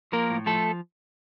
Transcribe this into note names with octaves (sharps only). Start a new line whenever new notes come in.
F3 A#3 A#4
A2
F3 A3 A4